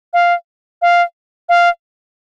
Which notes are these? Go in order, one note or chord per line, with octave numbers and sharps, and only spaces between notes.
F5
F5
F5